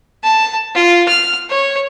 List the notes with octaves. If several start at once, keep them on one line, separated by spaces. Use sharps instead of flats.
A5
F4
F6
C#5